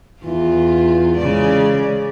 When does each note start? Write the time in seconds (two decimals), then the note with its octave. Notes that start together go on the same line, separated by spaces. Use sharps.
0.23 E2 E3 F4
1.17 C#3 G#3 D5